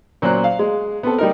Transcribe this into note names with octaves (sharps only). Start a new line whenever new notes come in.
A#2 F#3 C#4 C5 F#6
F5
G#3
B3 C4 A4
G3 D#4 A#4